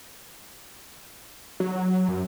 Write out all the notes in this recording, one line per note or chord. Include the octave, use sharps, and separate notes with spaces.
F#3
F#2